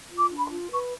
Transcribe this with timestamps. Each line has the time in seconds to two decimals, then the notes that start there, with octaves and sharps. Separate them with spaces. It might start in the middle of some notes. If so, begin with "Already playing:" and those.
0.10 F4
0.17 D6
0.31 D4
0.38 B5
0.44 C6
0.50 F4
0.71 B4 C#6